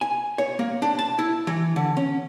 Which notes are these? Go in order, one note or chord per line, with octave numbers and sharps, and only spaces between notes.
G#5
C#5
A#3
D4
A5
E4
E3
D3
C#4